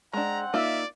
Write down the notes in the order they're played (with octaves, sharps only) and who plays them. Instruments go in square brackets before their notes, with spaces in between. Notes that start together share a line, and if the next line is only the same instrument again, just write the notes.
[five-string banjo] G#3 D4 [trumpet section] C4 F#5 [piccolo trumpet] A#5
[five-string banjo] A#3 D#4 F4 [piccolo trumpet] D5 [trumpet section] E5